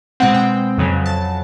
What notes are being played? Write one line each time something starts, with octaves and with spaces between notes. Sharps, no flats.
B2 G#3 C4 F#5
G5
F2 C#3 F#3
A5